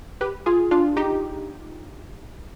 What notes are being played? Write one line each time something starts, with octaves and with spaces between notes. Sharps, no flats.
G4 B4
F4 G#4
D4 F4
D#4 G4